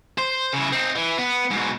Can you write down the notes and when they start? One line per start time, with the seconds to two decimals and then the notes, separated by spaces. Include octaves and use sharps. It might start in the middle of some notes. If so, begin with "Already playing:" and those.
0.18 C5
0.53 C#3 E4
0.72 C4 D#4
0.96 E3
1.19 B3
1.51 G#2 B2